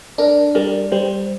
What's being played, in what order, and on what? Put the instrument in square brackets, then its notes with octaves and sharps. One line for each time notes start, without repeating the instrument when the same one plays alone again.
[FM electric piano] D4 [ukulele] A#4
[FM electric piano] G3 [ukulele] A#4 D5
[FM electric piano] G3 [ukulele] C5